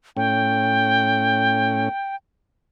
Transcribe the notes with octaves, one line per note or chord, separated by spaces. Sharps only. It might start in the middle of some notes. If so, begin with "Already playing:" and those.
A2 C#4 G5